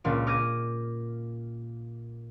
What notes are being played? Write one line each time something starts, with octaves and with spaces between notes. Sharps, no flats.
C#2 A#2 D4 D7
D6 F6 G6 G#6 A#6 D#7